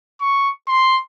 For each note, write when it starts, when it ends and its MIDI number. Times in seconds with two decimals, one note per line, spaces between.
0.21 0.49 85
0.68 0.98 84